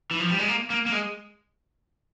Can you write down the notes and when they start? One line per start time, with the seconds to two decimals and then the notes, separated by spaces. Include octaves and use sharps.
0.11 E3
0.20 F3
0.30 G3
0.39 G#3
0.48 A#3
0.70 A#3
0.86 A#3
0.92 G#3